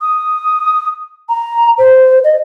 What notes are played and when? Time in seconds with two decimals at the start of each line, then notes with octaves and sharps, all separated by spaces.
0.01 D#6
1.29 A#5
1.79 C5
2.24 D#5